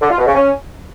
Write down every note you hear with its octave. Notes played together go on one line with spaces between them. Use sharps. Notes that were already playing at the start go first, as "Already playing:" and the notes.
D3
F4
B2
C#3
C#4